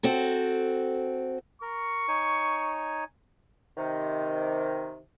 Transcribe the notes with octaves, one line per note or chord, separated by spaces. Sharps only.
C4 F#4 A4
A#4 C#6
D#4 C#5 G#5
C3 D#3